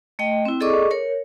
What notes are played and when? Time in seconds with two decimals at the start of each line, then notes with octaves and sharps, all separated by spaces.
0.19 A3 D#5 G5
0.45 C4 E4
0.60 G#4 A4 D5 D#5 C#6 D6
0.91 A#4 C#5